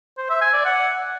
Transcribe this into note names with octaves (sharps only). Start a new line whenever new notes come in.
C5
E5
G#5
D5
F#5